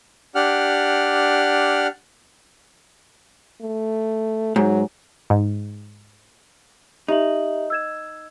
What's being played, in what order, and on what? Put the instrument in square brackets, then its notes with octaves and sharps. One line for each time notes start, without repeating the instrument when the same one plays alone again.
[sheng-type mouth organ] D4 G4 F#5 F6
[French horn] A3
[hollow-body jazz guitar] G#2 [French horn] F#3
[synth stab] G#2
[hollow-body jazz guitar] D#4 [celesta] G4 E5 F#7
[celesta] E6 G#6 E7